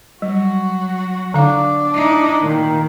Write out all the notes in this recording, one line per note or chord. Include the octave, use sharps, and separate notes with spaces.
F#3 G3 F#4
D3 D4 F5
D#4 E4
A#2 D#3